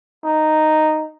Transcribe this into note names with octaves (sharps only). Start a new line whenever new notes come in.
D#4